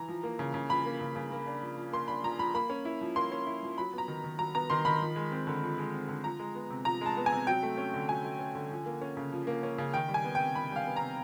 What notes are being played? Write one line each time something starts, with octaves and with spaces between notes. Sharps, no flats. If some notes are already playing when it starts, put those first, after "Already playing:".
Already playing: E3 A#5
F3
A#3
C#3
C#3
F3 B5
A#3
C#3
C#3
A#3
D4
F3
F3
A#3 C6
D4 B5
F3 A#5
F3 B5
A#3 B5
C#4
E4
F3
A#3 C6
C#4
E4
F3
F#3 B5
B3
A#5
D#3
D#3
F#3 A#5
B3 A#5
D#3 C6
D#3 B5
F3
G#3
C4
D3
F3
G#3
C4
D3
F3 A#5
G#3
B3
C3
F3 A#5
G#3 A5
B3
G#5
C3
F#3 G5
A3
C#4
D3
F#3 G#5
A3
C#4
D3
F3
A#3
C#4
C#3
F3
A#3
C#4
C#3
D#3 G5
G3
G#5
B3
C3 G5
D#3 B5
G3 F5
B3
C3 A#5